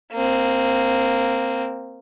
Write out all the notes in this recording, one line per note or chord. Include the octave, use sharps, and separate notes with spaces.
A#3 C4